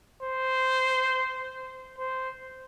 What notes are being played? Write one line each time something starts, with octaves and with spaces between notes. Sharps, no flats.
C5
C5